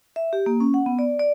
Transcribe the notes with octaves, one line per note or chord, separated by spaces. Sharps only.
E5
G4
A#3
C#4
F#5
B3
D5
D5